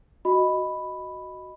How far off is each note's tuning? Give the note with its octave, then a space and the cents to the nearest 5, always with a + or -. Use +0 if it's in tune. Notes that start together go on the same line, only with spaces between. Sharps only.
F#4 +0 D#5 +0 B5 +0